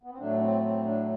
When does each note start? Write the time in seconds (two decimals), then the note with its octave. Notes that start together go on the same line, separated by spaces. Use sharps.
0.03 B3
0.11 C4
0.18 A2 F#3 A3 D4
0.36 D4
0.40 C4
0.62 C4
0.84 D4